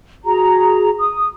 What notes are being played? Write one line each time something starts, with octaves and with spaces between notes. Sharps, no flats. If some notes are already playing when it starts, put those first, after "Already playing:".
F#4 G#4 A#5
D#6